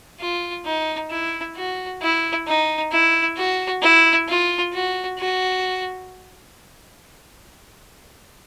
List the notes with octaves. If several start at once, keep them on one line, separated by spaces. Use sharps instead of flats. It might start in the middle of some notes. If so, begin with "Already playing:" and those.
F4
D#4
E4
F#4
E4
D#4
E4
F#4
E4
F4
F#4
F#4